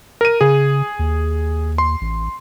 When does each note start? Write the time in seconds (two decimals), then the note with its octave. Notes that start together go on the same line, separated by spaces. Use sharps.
0.21 A#4 D#7
0.41 C#3 G#4
0.99 D#2
1.78 C6
2.01 A1